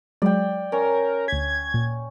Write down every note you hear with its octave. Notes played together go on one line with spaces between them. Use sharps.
F#3 G#3 D5 G5
C#4 A#4
D2 G#6 B6
A#2